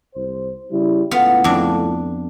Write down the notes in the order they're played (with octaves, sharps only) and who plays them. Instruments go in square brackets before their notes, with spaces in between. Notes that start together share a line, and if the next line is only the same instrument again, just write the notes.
[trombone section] C2 C5
C#3 G3 E4
[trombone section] C#2 A2 A3 [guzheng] B3 F4
[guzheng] F2 D4